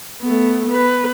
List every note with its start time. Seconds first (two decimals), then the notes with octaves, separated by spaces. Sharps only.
0.22 A3 B3
0.66 B3 B4